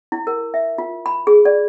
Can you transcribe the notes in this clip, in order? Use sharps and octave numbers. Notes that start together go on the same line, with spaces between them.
E4
A#4
E5
F4
B5
G#4
D5